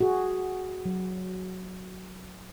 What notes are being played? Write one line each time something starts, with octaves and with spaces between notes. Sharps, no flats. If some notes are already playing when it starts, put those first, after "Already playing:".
F#4 G#4
F#3